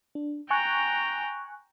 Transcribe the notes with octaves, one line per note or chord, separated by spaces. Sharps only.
D4
G5 G#5 A#5 C#6 F#6